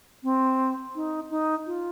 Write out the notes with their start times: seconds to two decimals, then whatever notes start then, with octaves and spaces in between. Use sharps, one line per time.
0.23 C4
0.95 D#4
1.30 D#4
1.66 F4